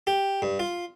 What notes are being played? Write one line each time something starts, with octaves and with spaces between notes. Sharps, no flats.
G4
G2
F4